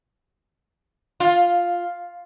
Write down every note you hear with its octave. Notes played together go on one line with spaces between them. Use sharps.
F4